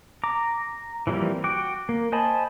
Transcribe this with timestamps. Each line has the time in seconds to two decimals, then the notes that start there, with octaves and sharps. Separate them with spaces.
0.24 A#5 D6
1.07 E3 F3 G3 A#3 C4
1.44 F#4 G5 D6
1.89 A#3
2.12 C5 D#5 G#5 A5 B5